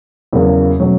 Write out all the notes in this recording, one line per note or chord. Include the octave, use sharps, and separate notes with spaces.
E2 C#3 F#3 A#3
B2 F#3 A3 C#4